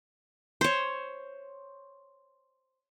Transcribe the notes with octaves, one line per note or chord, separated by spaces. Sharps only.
C5 C#5